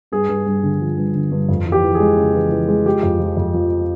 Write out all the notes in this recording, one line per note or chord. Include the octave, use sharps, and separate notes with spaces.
G2 G#4
G2
G2
D3
F3
G2
D3
G2
F2
E3
G4
E3
G#4
G#3
C#3
E3
E3
G#3
F3 G4
F2
F3
F2
F3